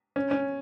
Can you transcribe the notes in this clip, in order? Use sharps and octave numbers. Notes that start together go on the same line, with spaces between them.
C#4
C#4